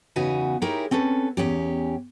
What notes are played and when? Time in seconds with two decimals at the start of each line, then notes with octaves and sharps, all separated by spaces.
0.16 E2 C#3 D#4 F#4 B4 G#5
0.62 D#4 E4 G4 G#4 A#4 C#5
0.91 C4 C#4 A4 B4
1.37 E2 G2 C#4 G4